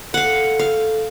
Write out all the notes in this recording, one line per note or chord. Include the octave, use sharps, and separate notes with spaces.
A4 F5 F#5
F5